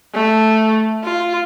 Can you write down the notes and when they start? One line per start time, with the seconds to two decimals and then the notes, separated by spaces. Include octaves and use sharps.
0.14 A3
1.04 F4